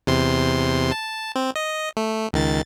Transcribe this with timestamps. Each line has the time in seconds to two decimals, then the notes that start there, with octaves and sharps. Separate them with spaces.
0.07 E2 C3 C6
0.91 A5
1.36 C4
1.56 D#5
1.97 A3
2.33 C#2 D#3 A6